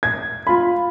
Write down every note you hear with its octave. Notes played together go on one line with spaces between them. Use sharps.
G#6
F4 B5